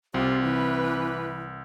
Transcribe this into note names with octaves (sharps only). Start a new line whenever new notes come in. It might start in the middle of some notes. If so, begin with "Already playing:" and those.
C2 C4 F4 G4
E3 B4